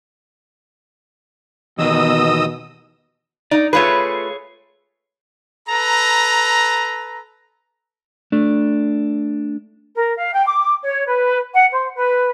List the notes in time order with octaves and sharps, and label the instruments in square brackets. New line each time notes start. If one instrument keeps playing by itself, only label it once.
[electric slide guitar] E2 D#3 [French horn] B2 [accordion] D#5 D#6 E6
[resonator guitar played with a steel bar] D#4 [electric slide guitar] D5
[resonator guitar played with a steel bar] A3 F4 B4 [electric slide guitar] G#4 C#5
[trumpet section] A4 B4 A#5
[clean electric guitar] A3 D4
[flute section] A#4
F5
G5
D6
C#5
B4
F#5
C5
B4